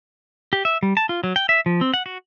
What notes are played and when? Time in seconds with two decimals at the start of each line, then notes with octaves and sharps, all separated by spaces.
0.53 G4
0.65 E5
0.83 G3
0.97 A5
1.09 F4
1.24 F#3
1.36 G5
1.49 E5
1.66 F3
1.81 C4
1.94 F#5
2.06 F#4